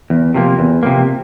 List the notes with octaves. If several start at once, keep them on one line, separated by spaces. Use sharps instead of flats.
E2
C3 F3 A#3
E2
C3 F3 A#3